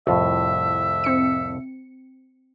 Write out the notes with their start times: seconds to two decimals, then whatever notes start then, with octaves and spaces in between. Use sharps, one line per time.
0.07 C2 F2 A2 F4 E5
1.04 C4 C#7